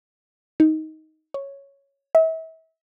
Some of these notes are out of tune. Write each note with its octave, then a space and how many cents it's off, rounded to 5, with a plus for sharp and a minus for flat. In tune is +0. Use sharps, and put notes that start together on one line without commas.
D#4 +15
C#5 +0
E5 -35